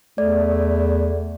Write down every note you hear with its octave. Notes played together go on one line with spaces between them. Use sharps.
E2 A3 D5